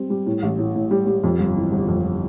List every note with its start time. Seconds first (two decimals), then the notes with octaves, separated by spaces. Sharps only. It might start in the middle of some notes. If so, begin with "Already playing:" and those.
Already playing: G3 C4
0.10 G3
0.26 A2
0.43 A1
0.59 A2
0.75 A2
0.91 G3
1.07 G3
1.24 F2
1.39 G1
1.57 E3
1.72 G1
1.88 F2